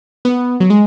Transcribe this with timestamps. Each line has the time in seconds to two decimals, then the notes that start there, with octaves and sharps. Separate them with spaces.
0.25 B3
0.60 F#3
0.70 G#3